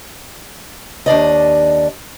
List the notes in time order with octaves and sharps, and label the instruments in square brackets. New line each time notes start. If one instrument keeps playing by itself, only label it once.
[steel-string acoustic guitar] D#2 D4 D5 D#5